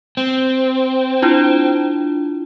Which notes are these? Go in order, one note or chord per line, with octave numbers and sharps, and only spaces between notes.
C4
D4 E4 F4